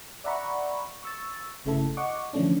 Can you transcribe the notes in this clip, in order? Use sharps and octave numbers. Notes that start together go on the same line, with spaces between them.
D5 E5 F#5 A#5 B5 C#6
C#6 E6 A6
G1 C#3 A3 E4 A4
D#5 F#5 C#6 D6
D3 E3 F3 A3 C#4 D4